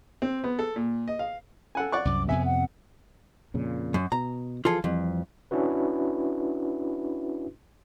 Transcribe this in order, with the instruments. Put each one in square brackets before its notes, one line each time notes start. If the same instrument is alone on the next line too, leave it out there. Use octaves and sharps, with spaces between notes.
[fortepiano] C4
B3
A4
A#2
D#5
F5
A4 F#5 G#5
D5 F#5 C#6
[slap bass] C2 F#2 [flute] D6
[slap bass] F2 C3 B3 [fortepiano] E5 [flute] G#5
[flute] F#5
[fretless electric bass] F2 A#2 C#3
[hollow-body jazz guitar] F#2
[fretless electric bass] B2 [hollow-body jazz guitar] A#5
[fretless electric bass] E3 F3 [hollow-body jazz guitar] F4 G#4 A4
[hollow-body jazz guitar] F2 [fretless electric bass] E3 F3 G3
[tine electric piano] C#4 D4 E4 F#4 B4